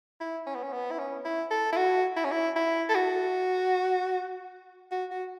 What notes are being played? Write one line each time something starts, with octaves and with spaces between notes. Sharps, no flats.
E4
C#4
B3
C#4
B3
E4
C#4
E4
A4
E4
F#4
E4
C#4
E4
E4
A4
F#4
F#4
F#4